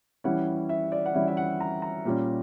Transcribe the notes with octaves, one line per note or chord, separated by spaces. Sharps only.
E3 G3 C#4 E4 F#5
E5
D5
F#5
E3 G3 C#4 E4 E5
E5
F#5
A#5
A#5
A#2 G3 C#4